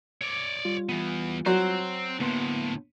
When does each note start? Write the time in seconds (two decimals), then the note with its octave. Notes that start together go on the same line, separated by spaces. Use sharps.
0.21 C#5 D5
0.65 G3 F4
0.89 E3 B3
1.46 F#3 C4 C5
2.20 D2 A2 A#3 B3 C6